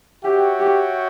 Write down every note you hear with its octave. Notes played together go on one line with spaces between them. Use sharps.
F#4 G4 C#5 E5 G5
G4